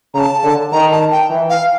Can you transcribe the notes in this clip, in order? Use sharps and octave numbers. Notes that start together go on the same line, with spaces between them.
C#3 A#5
A5
D3
D#3 A#5
A5
G5
E3
F5